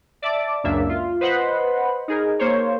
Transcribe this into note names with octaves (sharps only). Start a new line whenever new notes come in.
D5 E5 A5 D6
C#2 F#2 A#3 D4 E5
F4
B4 C5 D#5 F#5 B5
D#4 G#4 A#4
A#3 C5 C#5